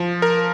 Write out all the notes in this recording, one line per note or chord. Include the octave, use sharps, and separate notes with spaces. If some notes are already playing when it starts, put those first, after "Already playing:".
Already playing: F3
A#4